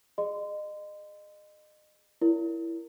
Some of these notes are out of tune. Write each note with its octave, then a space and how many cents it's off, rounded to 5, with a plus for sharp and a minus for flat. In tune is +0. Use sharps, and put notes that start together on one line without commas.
G#4 +0 D#5 -30 C6 -30
E4 +15 A#4 +0 C#5 +45